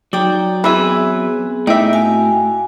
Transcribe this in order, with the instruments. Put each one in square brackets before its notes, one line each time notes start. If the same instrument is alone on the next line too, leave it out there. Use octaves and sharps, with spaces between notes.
[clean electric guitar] F#3 [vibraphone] D#4 A#5 [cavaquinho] D5 G5
[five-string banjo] E3 [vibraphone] B3 C4 G#4 [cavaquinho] B4 E5
[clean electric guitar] A2 [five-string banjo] D#4 E5 [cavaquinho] G4
[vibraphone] F#4 F5 G#5